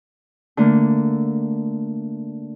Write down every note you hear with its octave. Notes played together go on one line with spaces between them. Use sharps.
D3 A3 A#3